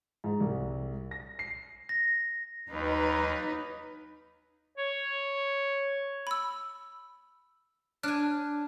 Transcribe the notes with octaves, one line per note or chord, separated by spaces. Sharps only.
G#2
C2
A#6
C7
A#6
D#2 F#3 D#4 B4
C#5
B5 E6
D4 G#5 F6 F#6